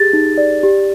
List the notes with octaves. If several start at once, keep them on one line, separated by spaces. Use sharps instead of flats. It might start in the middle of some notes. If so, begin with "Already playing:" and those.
Already playing: G4 G#4 A6
D#4
D5
G4